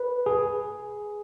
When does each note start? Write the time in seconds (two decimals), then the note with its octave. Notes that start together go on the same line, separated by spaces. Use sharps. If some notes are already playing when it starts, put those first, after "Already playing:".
Already playing: B4
0.26 G#4